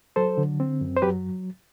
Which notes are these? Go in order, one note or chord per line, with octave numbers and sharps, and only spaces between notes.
F#3 A4 C5
D3
C4
F#2
C5
F#3 G4 B4